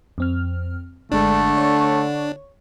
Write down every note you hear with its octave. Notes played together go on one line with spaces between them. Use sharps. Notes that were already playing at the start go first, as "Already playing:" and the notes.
F2 C4 F6
G#1 D3 G#3 A3 D4 A4
C#5 C#6